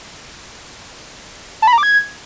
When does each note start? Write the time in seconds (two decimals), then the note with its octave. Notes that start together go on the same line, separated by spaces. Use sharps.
1.62 A5
1.67 B5
1.73 A#5
1.78 D6
1.83 G#6